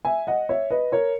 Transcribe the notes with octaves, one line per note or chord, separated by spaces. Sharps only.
E5 G#5
D#5 F#5
C#5 E5
B4 D#5
A#4 C#5